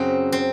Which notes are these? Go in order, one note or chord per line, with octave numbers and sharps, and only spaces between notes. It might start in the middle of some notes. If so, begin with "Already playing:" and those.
Already playing: F#2 C#3 F#3 C4
C4